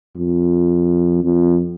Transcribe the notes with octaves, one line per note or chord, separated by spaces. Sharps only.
F2
F2